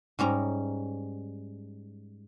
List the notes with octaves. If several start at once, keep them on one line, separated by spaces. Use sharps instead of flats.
G#2 G3 C#4 A#5